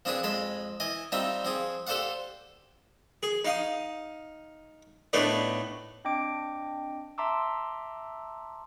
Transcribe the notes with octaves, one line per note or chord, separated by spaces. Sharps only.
F3 C4 D4 G#4 B4
F2 G#3 A5 B5 C6
E3 D#5 G#5
G3 C4 D#4 F4 E5
F3 C4 G#4
G4 A4 C5 D5 F5 F#5
G#4
D#4 F5 D#6
A2 A3 B3 D4 D#4
C4 D4 D#5 G5 D6 D7
E5 A5 A#5 C6 D6 E6